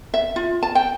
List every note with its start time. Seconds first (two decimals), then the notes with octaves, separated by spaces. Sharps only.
0.14 E5
0.36 F4
0.63 A5
0.75 G5